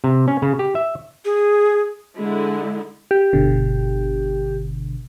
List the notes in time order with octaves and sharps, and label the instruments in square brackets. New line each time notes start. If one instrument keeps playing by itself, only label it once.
[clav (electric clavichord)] C3
C#4
C#3
G4
E5
[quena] G#4
[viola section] D3 G#3 E4
[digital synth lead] G4
[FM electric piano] G1 B2 D3